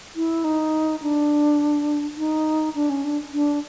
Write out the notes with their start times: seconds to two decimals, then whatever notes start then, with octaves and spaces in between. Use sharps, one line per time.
0.16 E4
0.44 D#4
1.02 D4
2.18 D#4
2.75 D4
2.90 C#4
3.04 D4
3.33 D4